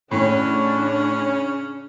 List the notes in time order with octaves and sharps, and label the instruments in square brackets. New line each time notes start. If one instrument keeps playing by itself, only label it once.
[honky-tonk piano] A2 [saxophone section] C#3 C#4 [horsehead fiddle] D4